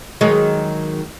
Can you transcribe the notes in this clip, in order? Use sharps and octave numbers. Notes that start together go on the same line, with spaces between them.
D#3 F#3 G#3